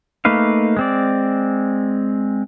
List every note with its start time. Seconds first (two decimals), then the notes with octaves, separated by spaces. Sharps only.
0.25 A3 A#3 D#4 B4 F5
0.77 G#3 C4 D5